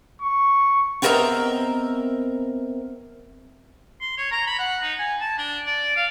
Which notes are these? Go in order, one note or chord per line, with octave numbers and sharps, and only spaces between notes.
C#6
B3 C4 A#4 D#5 E5 A#5
C6
C#5
A#5
B5
F#5
D#4
G#5
A5
D4
D5
F5